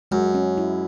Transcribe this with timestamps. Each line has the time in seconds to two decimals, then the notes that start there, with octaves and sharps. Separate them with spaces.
0.11 F#2 G#3
0.35 C#4
0.58 E4